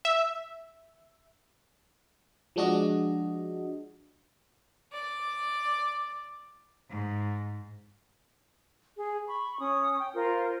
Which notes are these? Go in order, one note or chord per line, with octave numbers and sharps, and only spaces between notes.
E5
F3 G#3 D4 F#4 D#5
D5
G#2
G#4
B5 C#6
C#4 D#6
G5
F4 A#4 C5